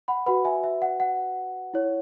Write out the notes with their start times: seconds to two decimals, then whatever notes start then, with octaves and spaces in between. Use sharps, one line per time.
0.08 F#5 B5
0.26 F#4 B4 F#5 B5
0.45 E5 G#5
0.64 E5
0.82 F#5
1.00 F#5
1.74 E4 C#5